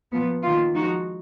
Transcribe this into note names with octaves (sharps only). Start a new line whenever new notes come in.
A#2 F3 B3
D#3 A#3 F4
F3 G#3 D#4 F#4